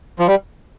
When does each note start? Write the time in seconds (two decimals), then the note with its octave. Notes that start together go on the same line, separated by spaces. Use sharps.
0.20 F3
0.28 G3